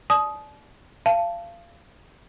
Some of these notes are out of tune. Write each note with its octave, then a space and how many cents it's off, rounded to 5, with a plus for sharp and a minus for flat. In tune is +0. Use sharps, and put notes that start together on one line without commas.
D5 +0 A5 -40 D#6 +5
F5 -30 A5 +0